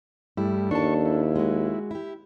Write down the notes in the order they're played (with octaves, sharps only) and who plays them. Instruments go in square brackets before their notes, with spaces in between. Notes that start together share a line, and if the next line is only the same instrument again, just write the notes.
[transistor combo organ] G2 G3 A3 [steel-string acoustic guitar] E4
[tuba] D#2 [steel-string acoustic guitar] D4 A4 A5 [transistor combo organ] C#6
[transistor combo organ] E4
[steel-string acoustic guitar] G#3 F#4
E4 G4